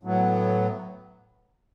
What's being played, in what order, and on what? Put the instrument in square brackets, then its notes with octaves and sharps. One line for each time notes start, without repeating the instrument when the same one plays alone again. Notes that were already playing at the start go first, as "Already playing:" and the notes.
[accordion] A2 F#3 B3